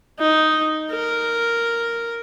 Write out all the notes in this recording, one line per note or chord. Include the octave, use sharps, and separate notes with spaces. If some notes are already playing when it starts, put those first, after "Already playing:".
D#4
A#4